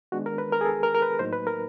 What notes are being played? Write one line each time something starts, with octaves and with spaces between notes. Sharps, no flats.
D#3 G#3 B3 D4 F#4
A#4
B4
A#4
G#4
A4
A#4
A#4
B4
A2 F#3 A#3 D#4 C5
B4
A#4